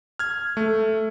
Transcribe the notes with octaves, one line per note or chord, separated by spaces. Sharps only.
F6 G#6
A3